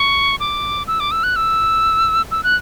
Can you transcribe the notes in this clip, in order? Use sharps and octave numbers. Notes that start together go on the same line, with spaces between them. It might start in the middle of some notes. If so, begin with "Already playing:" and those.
Already playing: C#6
D6
E6
D6
E6
F#6
E6
E6
F#6